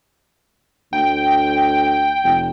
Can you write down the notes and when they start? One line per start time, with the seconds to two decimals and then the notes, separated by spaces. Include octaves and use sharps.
0.93 D2 G5
2.24 F1